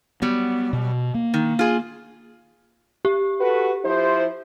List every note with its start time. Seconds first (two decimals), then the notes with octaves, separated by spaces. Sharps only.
0.22 F#3 G3 B3
0.73 B2
1.14 A#3
1.34 D#3
1.59 F4 G#4
3.05 G4
3.40 F#4 A4 B4
3.85 F3 E4 C5